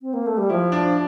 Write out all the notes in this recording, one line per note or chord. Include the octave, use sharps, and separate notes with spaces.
C4
A#3
A3
G3
F3 E4
D4